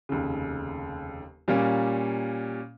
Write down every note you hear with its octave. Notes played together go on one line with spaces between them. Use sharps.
F1 D#2 C#3
A#2 G3 A#3 C#4